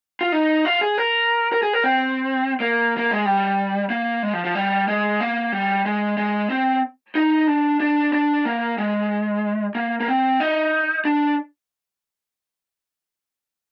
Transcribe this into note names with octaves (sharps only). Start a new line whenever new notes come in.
F4
D#4
F4
G#4
A#4
A#4
G#4
A#4
C4
A#3
A#3
G#3
G3
A#3
G#3
F3
F3
G3
G#3
A#3
G3
G#3
G#3
C4
D#4
D4
D4
D4
A#3
G#3
A#3
A#3
C4
D#4
D4